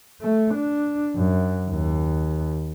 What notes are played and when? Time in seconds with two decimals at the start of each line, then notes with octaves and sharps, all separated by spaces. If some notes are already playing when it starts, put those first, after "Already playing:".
0.21 A3
0.54 D4
1.16 F#2
1.70 D#2